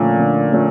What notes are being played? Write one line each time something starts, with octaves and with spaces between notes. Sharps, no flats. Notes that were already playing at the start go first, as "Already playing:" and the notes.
Already playing: A#2 D3 F3 A3 C#4
D3
F3 A3 C#4